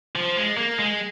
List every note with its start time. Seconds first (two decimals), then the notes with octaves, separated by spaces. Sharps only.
0.16 F3
0.37 G#3
0.57 A#3
0.79 G#3